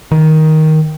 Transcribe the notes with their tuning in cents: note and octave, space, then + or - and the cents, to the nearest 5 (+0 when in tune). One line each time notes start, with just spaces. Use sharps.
D#3 +10